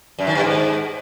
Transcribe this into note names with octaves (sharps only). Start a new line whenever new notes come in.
F#2
D#3
G2
G#2